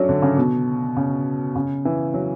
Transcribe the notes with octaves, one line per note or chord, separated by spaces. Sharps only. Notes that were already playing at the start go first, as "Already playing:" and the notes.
Already playing: F#3 A3 C#4 D4
D3
C#3
B2
C#3
C#3
E3
F#3